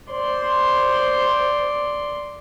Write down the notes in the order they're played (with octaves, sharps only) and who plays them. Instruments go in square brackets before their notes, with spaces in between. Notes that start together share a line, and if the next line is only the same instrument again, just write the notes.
[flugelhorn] C5 [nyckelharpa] D5 C6